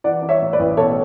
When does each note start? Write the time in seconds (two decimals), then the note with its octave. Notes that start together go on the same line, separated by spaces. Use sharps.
0.04 E3 D5 F#5
0.22 E3
0.29 C#5 E5
0.42 A2
0.53 B4 D5
0.59 A1
0.77 B2 A4 C#5